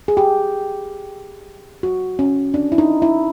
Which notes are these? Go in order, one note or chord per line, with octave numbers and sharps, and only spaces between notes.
G#4
G4
F#4
C#4
D4
E4
D#4
E4